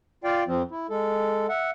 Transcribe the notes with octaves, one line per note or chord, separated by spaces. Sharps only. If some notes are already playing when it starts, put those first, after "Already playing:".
F4 D5 F5 G5
F2 F3 C4
E4
G#3 A4
E5 F#5